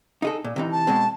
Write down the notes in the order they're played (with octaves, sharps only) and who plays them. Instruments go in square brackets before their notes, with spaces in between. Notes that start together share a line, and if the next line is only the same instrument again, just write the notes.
[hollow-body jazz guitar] D#4 G#4 A4
A#2
C3 E3 D#4
[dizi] A5
[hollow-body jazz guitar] B2 G#3 C4